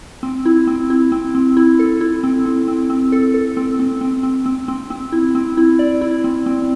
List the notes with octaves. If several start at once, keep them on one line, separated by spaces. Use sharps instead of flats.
C4
E4
C4
E4
C4
C4
E4
A4
E4
C4
C4
C4
C4
A4
A4
C4
C4
C4
C4
C4
C4
C4
E4
C4
E4
D5
E4
C4
C4